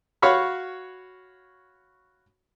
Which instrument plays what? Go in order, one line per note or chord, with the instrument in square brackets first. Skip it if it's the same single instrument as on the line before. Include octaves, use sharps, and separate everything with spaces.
[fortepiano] F#4 C#5 F5 B5